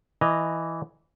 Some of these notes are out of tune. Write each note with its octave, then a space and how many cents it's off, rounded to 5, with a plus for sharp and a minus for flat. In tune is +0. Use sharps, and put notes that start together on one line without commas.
E3 +0 D#5 -10 A#5 +0